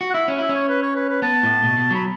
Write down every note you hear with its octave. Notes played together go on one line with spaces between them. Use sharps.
F#4
F#5
E4 E5
C#4
E4 E5
C#4
C#5
B4
C#5
B4
B4
B3 A5
A2
B2
B2
F#3 B5